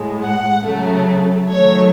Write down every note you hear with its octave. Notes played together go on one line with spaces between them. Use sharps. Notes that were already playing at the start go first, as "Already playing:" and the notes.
Already playing: A2 G#3
F#5
C#3 F#3 A3
D#3 F#3 A3 C#5